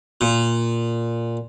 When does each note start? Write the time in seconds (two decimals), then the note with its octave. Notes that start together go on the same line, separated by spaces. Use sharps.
0.21 A#2